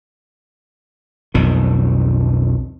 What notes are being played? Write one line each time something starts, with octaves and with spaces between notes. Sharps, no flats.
B1 F2 D#3